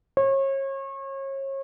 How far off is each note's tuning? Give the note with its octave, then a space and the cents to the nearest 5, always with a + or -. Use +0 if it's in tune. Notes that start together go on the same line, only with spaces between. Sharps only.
C#5 -35